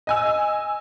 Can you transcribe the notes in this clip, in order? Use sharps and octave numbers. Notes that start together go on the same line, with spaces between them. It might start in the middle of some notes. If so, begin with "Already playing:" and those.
D#5 G#5 E6